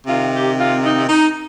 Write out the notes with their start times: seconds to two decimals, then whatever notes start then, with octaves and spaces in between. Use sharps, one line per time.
0.07 C3 D#3 F4
0.32 G4
0.58 F4
0.83 D#4
1.09 D#4